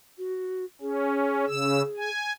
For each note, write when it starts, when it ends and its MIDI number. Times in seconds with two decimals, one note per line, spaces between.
0.18 0.64 66
0.82 1.45 61
0.82 2.10 68
1.48 1.83 49
1.48 1.83 88
1.97 2.33 80